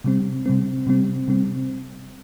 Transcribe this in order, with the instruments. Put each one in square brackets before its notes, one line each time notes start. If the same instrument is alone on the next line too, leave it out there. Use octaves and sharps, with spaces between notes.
[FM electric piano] C3 G3 C4
C3 G3 C4
C3 G3 C4
C3 G3 C4